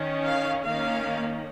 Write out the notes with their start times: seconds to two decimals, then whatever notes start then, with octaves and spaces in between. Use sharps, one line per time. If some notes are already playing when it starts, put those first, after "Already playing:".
Already playing: D#3 C#4
0.26 F5
0.65 D#3 A#3 C#4 F5